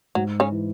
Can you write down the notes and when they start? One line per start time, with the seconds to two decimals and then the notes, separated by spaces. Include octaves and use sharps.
0.15 G#2 F#3
0.40 C#3 C#4
0.52 E3